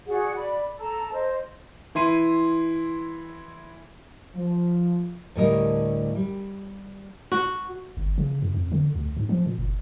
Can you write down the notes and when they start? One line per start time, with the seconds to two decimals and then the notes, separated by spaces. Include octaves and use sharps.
0.07 F#4 G#4 D5 F#5
0.35 D5 B5
0.79 A4 A5 A#5 E6
1.12 C5 D#5
1.95 E3 E4 C6 D#7
4.35 F3
5.35 D2 A2 D3 G3 A#4 D#5
6.15 G3
7.32 F#4
7.97 G1
8.18 C#3
8.42 F#2
8.54 F2
8.72 D3
8.95 D2
9.17 G#2
9.29 F3
9.46 A#2
9.59 F#1